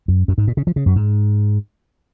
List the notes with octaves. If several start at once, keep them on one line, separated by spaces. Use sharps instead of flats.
F#2
F#2
G#2
A#2
C#3
F3
C#3
F#2
G#2